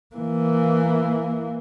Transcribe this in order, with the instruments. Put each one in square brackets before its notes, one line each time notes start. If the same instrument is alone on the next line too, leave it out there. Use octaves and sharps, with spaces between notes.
[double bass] E3 A#3